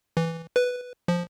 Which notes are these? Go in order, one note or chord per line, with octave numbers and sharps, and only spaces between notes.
E3
B4
F3